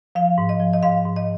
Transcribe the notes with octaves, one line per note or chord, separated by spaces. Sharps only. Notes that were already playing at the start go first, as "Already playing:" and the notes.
F3 F5
G#2
D#5
F3
D#5
G#2 F5
G#2
D#5